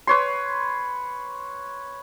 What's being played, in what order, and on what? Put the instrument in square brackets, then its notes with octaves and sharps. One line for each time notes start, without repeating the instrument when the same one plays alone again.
[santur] B4 C#5 C6